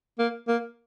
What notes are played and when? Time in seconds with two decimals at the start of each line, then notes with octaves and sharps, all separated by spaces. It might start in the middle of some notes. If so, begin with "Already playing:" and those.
0.19 A#3
0.48 A#3